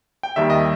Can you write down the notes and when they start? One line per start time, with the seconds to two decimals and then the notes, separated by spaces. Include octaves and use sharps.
0.23 G5
0.36 D#2 D#3 G3 E5
0.50 D#5